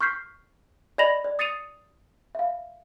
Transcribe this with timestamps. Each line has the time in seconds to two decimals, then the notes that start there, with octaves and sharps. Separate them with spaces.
0.01 C#6 F6 G6 B6 C7
0.98 D5 D#5 B5 A#6 F7 F#7
1.24 D5
1.39 D#6 A6 C7 C#7 D#7 F7
2.35 E5 F5